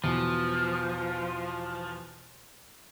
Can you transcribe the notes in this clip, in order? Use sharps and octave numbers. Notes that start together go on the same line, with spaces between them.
E2 B2 F3